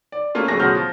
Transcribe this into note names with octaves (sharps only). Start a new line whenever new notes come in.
D5
A3 A#3 C#4 F4
D1 A3 C#4 G#4 A#6
B2 F#3 G#3 F6 G6
F3